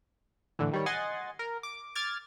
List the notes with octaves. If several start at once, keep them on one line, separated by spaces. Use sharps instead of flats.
A2 D3 E3
D#3 G3 C#5
D#5 F#5 G#5 C6 A6
A#4
D6
D6 F6 G#6 A6